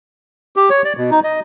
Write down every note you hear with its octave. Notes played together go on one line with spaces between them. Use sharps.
G4
C#5
D5
B2
D#4
D#5